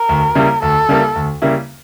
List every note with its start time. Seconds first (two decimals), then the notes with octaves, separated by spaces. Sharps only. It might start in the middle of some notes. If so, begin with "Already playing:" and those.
Already playing: A#4
0.09 D2
0.35 C#3 G3 A#3 E4
0.62 D2 A4
0.89 C#3 G3 A#3 E4
1.16 D2
1.42 C#3 G3 A#3 E4